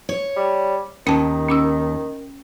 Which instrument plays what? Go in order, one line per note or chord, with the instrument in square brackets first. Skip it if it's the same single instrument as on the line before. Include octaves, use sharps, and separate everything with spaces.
[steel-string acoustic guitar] C#5
[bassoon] G3
[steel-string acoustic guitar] D#2 [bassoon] D#3 [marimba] C#4 A5
[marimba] C#4 D6 E6